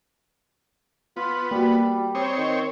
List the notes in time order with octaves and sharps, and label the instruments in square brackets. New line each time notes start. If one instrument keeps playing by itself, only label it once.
[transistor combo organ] B3 [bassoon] F4
[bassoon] G3 [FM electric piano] A#3 F#4
[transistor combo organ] C4 C#5 [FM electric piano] D#6
[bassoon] D#3